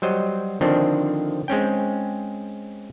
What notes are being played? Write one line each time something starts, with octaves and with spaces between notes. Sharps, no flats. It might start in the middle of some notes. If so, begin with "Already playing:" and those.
F#3 G3 C5 D#5
D3 D#3 F3 C4 D4
G#3 C4 C#4 G5